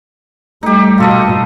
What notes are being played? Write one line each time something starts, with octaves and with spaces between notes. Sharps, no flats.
G3 A3 D#4 G4
B2 F4 A4 D#5